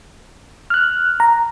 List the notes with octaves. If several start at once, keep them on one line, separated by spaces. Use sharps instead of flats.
F6 F#6
A#5